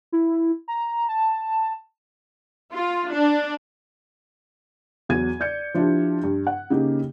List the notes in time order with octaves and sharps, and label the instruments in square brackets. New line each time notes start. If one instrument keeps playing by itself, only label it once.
[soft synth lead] E4
A#5
A5
[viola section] F4
D4
[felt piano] E2 F#3 G#6 D#7
D5 G6 C#7
F3 D4 E4 F4 G4
G2
F#5
C#3 A#3 D#4 G4